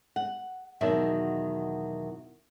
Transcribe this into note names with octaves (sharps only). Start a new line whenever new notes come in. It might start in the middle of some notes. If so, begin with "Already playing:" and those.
F#5
E2 B2 D#3 F#3 E5